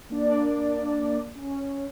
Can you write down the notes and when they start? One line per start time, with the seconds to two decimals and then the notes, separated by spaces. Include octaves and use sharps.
0.10 A#3 D4 D5
1.35 C#4